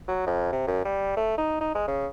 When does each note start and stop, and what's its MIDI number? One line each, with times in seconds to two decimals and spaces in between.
0.08 0.27 54
0.27 0.51 41
0.53 0.63 48
0.67 0.82 42
0.85 1.13 55
1.17 1.35 57
1.38 1.59 63
1.61 1.72 63
1.75 1.83 56
1.88 2.07 49